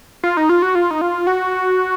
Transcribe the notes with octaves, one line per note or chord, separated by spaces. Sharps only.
F4
D#4
F4
F#4
F4
D#4
F4
F#4